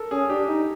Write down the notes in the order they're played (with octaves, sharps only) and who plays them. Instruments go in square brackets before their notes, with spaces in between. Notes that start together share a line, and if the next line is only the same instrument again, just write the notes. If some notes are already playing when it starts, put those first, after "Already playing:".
Already playing: [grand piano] A4 A#4
[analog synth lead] C#4 [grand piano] G#4
[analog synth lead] D4 [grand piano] G4
[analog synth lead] D#4